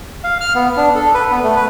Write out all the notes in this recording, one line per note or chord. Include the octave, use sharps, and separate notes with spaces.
F5
F6
B3
D4
A4
B4
B3
A3
B4